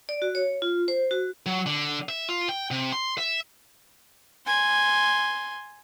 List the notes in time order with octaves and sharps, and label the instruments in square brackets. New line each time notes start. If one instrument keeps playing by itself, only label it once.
[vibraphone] D5
F#4
C#5
F4
C5
F#4
[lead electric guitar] F#3
D3
E5
F4
G5
C3
C6
E5
[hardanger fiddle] G#5 C6